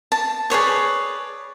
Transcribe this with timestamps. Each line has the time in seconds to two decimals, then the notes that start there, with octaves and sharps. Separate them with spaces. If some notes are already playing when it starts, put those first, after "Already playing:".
0.12 A5
0.50 G#4 B4 C#5 D5